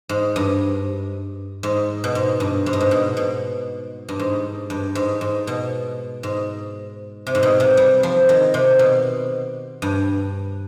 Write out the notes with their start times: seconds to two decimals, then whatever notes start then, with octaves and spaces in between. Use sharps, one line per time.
0.09 G#2
0.36 G2
1.63 G#2
2.04 B2
2.15 G#2
2.40 G2
2.66 G#2
2.73 G2
2.81 G#2
2.91 B2
3.17 B2
4.09 G2
4.19 G#2
4.70 G2
4.95 G#2
5.21 G#2
5.47 B2
6.23 G#2
7.27 C3
7.35 G#2
7.43 B2
7.60 C3
7.77 G3
8.03 F3
8.29 D#3
8.54 C3
8.79 B2
9.82 G2